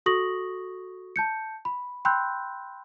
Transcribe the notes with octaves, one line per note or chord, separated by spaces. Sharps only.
F#4 A4 C#6 D#6 A#6 F#7
A5 G6 C#7
B5
G5 B5 C6 E6 F#6 G6